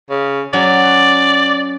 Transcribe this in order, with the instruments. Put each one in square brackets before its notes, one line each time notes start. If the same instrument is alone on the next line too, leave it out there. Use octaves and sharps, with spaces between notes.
[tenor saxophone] C#3
[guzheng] F#3 C#4 F#4 [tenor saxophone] D5